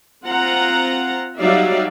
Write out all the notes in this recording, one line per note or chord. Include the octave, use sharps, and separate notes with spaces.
C4 F4 F#5 A#5
F#3 G3 D#4 D5 E5 F5